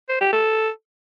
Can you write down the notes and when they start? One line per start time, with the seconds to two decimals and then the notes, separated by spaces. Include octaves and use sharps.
0.09 C5
0.21 G4
0.32 A4